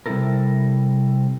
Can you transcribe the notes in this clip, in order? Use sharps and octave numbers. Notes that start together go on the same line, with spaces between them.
C3 G3 A#3 E4 A4 A#4